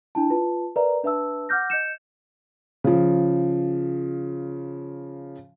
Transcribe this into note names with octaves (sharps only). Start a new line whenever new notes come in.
D4 E4 A5
F4 B4 A5
A#4 B4 D5 E5 A#5
D4 B4 E5 A5 E6
F#5 D6 F6 G6 A#6
D#5 G6 C#7 E7
C#3 F3